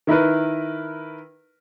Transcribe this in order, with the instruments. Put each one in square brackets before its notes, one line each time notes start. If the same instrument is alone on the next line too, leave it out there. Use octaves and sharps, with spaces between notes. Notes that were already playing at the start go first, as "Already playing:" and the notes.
[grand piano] D#3 E4 A#4 B4